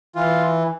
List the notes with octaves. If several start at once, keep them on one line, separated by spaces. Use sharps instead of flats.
E3 F4